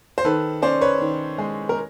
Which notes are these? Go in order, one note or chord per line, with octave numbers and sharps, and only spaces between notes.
C5
D#3 A4 B4
C#4 C5 D5
B4 C#5
D#3
G#3
A#4